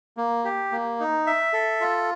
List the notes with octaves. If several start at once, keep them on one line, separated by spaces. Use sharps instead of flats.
A#3
G4
A#3
D#4
E5
A4
F4